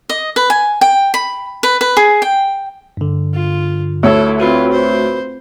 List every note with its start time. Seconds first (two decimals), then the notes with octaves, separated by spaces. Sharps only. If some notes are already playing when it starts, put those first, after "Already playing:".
0.09 D#5
0.36 B4
0.50 G#5
0.81 G5
1.14 B5
1.63 B4
1.81 B4
1.97 G#4
2.22 G5
2.97 G2 D3
3.34 F4
4.03 D2 E4 A4 C#5
4.40 C4 F4 F#4 B4 B5
4.72 C5